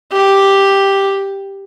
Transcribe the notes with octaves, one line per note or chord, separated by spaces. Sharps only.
G4